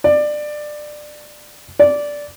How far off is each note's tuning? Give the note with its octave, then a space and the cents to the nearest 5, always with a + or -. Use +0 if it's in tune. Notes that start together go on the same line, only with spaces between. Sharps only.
D5 +20
D5 -10